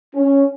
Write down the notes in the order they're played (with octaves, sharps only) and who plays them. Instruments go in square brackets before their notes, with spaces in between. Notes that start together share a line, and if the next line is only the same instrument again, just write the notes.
[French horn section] C#4